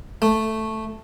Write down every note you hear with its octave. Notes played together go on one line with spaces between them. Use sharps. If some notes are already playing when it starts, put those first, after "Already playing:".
A3